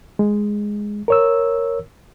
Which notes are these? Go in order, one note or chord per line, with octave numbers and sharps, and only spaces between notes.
G#3
A#4 C#5 E6